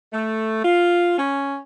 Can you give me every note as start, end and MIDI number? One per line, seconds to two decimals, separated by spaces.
0.13 0.61 57
0.63 1.14 65
1.18 1.57 61